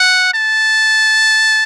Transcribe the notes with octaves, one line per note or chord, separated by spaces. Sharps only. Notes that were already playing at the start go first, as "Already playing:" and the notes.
Already playing: F#5
A5